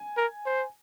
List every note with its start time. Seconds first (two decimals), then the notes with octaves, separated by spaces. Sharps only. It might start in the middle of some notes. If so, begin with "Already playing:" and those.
Already playing: G#5
0.17 A#4
0.46 C5